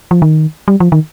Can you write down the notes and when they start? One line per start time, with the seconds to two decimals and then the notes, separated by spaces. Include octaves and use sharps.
0.11 F3
0.22 D#3
0.68 G3
0.80 F3
0.92 D#3